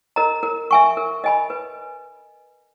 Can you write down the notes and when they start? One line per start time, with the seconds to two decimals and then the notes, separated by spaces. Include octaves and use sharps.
0.16 A#4 D#5 A#5
0.43 A#4
0.71 E5 G#5 C#6
0.97 A#4
1.24 D#5 G#5 B5
1.50 B4